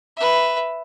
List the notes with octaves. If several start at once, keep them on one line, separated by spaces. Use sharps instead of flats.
B4 E5